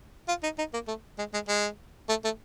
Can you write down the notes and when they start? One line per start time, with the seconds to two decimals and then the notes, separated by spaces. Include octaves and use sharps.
0.28 F4
0.43 D#4
0.58 D#4
0.73 A#3
0.88 A3
1.18 G#3
1.33 G#3
1.48 G#3
2.09 A3
2.24 A3